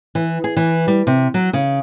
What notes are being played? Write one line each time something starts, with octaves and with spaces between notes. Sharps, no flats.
E3
G#4
E3
G3
C3
F#3
C#3